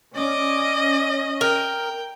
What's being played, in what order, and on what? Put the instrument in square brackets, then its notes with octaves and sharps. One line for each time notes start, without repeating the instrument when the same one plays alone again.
[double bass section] C#4 [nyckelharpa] D5 D6 [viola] D#5
[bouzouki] A#4 [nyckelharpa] G5